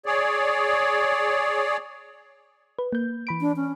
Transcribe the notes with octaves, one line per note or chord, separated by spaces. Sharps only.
G#4 C#5 D5
B4
A#3 G6
E3 B5 D7
D4
C#4